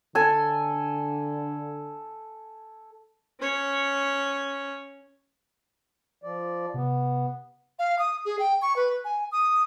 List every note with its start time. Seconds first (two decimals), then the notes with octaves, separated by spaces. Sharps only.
0.15 D3 A4 G#5
3.40 C#4 C#5
6.23 F3 D5
6.74 C3 B3
7.79 F5
7.99 D#6
8.25 G#4
8.39 G5
8.62 C#6
8.76 B4
9.05 G#5
9.32 D#6